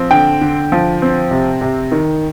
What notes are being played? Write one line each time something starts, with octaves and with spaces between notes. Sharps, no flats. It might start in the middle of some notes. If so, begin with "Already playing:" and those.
Already playing: F3 C4
D3 G5
D3
F3
C4
C3
C3
D#3